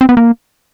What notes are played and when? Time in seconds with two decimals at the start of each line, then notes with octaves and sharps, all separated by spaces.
0.01 C4
0.09 B3
0.17 A#3